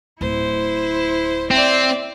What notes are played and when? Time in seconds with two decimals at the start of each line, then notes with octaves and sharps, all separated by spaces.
0.21 D1 E4 C5
1.51 C4 D5 E5